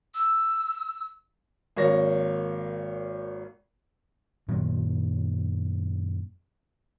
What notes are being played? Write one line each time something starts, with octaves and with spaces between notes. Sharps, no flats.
E6
G#1 A#3 C#5 A#6
F#2 A#2 D#3 F#3